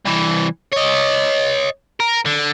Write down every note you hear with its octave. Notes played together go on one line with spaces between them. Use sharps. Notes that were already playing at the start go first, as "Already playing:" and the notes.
C2 E3
C#5 D#5
A#4
D3